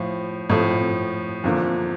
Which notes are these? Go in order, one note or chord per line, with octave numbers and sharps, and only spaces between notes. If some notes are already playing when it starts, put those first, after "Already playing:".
Already playing: A2 F3
A2 F3 A3
E2 D3 F3 A#3